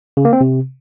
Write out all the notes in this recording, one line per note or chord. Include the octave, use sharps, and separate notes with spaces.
C#3
A#3
C4
C3